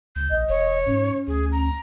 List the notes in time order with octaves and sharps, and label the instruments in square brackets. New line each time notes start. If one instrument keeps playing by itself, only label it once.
[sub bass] C#2 [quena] G6
[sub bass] A#1 [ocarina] D#5
[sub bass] E1 [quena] C#5
[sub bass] G#2 [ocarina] C#4
[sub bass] D2 [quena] G#4
[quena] A#5